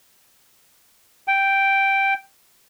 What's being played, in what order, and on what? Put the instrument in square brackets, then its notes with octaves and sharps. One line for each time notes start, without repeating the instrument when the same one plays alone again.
[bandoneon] G5